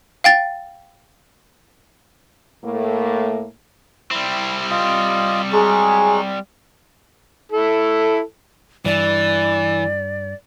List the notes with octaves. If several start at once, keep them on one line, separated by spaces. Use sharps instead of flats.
F5 G5 A6
A2 A3 A#3
G3 C4 E4
F4 D#5
F#3 G#3 G#4 C#6
E4 A4
G2 E3 D5